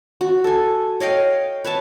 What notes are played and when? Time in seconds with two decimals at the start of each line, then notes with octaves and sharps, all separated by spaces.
0.21 F#4
0.44 A4 G#5
1.00 C#5 D#5 F5 G5
1.64 B4 C#5 E5 A5